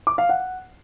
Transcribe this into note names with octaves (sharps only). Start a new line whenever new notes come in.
D6
F5
F#5